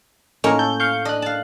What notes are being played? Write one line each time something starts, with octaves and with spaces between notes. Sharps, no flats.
A2 A#3 C#4 D#4 A#4
A4 G6
F5 C#6 G6
D4 D#5 F#6
F5 A5